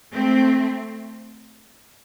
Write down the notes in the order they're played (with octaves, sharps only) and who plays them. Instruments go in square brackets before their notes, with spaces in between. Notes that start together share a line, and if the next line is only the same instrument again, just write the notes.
[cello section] A3 C4